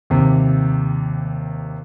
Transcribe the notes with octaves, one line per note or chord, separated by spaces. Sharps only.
D#2 C3